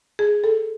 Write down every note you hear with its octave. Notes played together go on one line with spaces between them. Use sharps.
G#4
A4